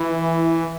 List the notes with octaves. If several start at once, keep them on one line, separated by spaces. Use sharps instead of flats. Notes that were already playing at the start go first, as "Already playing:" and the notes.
Already playing: E3